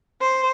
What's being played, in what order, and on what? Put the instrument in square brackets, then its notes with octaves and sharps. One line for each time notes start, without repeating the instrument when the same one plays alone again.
[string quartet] C5